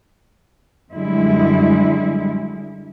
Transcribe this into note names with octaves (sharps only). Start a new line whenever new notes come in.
F#2 D3 G3 G#3 E4